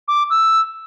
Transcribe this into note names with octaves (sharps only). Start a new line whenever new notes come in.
D6
E6